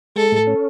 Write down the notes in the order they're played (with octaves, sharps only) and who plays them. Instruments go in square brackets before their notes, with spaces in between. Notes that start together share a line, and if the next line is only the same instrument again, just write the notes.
[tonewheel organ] G#3 [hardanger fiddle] A4
[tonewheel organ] A2
C#4